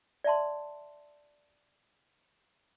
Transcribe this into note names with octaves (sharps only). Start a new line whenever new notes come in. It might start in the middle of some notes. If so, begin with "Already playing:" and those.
D5 E5 A5 C6